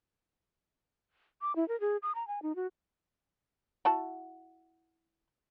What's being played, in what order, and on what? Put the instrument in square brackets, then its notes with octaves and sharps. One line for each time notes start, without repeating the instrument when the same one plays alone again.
[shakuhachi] D6
E4
A#4
G#4
D#6
A#5
G#5
D#4
F#4
[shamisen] E4 F#4 A5